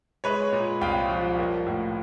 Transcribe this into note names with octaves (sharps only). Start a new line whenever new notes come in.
G#3 B4 C#5
A#2
C2 F5 G5
F3
A#3
A2